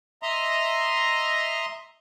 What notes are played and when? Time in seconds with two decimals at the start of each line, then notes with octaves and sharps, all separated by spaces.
0.23 D#5 E5 A#5 C6